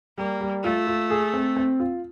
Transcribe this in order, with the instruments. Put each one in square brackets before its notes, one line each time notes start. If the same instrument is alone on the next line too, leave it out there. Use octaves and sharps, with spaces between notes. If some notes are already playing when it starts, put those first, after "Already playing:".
[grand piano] G3 [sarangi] A#3
[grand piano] G3
[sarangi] A3 [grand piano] F4
[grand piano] F4
G#4
C4
C4
F4